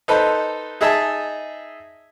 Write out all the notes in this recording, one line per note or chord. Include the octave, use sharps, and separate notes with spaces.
D#4 A4 B4 C5
D#4 G#4 D#5 E5 A5